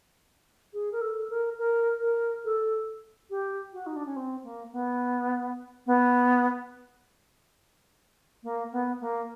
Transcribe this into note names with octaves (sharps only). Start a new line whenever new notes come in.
G#4
A#4
A4
A#4
A#4
A#4
A4
G4
F#4
D#4
D4
C#4
C4
A#3
B3
B3
A#3
B3
A#3